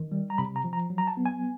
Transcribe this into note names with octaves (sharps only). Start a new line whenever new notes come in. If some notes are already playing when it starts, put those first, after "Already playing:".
Already playing: D#3
G3
A#5
C3 B5
A#5
F3
A#5
F#3
A#5
A5
B3
G#5